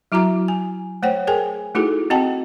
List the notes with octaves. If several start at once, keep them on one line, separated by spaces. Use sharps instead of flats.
F#3 E4 F#4 A#5 D6
G#5
A3 C5 C#5 F#5 G5
G#4 A#4 G5 G#5
A3 D#4 E4 F#4 G#4 A4
C4 F#4 D#5 F#5 G5 A5